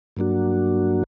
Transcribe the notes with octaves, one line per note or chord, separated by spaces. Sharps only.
G2 F#3 A#3 D4 F#4